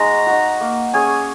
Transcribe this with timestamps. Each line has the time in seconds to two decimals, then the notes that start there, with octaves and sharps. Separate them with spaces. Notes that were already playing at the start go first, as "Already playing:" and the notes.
Already playing: G#3 D#4 F#4 A#5
0.26 D#4 F#4
0.61 A#3
0.93 C#4 G#4 C#5 G#5